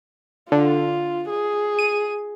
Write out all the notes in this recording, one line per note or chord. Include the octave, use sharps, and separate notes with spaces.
D3 F4
G#4
D#7